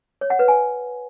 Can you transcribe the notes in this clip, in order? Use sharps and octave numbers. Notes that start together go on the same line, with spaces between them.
C#5
F#5
B4
G#5